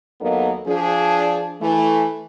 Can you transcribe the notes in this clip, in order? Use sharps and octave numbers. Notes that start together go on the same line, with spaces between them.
D#2 F#3 A#3 B3 D#4 A4
F3 D4 G#4
E3 A3